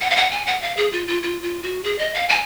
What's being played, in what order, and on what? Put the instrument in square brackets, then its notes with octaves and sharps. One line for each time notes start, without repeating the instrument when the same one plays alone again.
[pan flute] F#5
F5
F#5
G#5
F#5
F5
G#4
F4
F4
F4
F4
F#4
G#4
D#5
F5
G#5